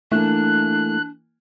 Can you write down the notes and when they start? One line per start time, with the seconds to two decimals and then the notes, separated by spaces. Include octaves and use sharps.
0.12 E3 A3 A#3 D4 F#6